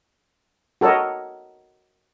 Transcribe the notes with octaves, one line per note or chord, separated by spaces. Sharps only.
F#4 A4 A#4 C#5 D#5